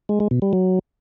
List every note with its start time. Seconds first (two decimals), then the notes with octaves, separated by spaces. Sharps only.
0.09 G#3
0.20 G#3
0.31 B2
0.42 G3
0.53 F#3